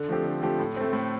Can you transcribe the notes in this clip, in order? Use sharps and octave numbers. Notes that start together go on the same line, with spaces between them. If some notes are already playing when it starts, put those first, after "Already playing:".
Already playing: D3
F3 A3 C4 G4
D3
F3 A3 C4 G4
A2
A3 C4
A2